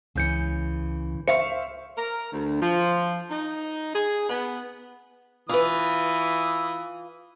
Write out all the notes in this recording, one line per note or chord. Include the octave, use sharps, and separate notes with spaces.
C#2 C#3 E3 G6 C#7
C5 E5 F5 C#6 C#7
A#4
D2
F3
D#4
G#4
B3
E3 F4 B4 D#6